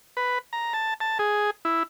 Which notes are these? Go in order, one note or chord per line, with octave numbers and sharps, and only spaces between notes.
B4
A#5
A5
A5
G#4
E4